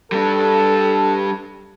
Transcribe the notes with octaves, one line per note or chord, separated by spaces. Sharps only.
G3 D4 A4